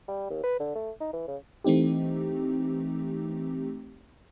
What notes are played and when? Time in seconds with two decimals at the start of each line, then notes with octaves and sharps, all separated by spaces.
0.08 G3
0.30 D#2
0.44 B4
0.60 D3
0.76 A3
1.00 D#4
1.13 E3
1.28 C#3
1.64 E3 A3 C4 D#4 G4